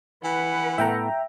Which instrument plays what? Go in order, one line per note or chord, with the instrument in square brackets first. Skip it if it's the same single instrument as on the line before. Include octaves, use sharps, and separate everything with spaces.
[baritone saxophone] E3 [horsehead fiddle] B4 F#5
[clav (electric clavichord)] A2 B3 A4 [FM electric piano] E5 G5 A#5